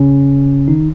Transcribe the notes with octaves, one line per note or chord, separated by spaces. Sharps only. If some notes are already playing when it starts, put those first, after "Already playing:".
Already playing: C#3 C#4
D#3 D#4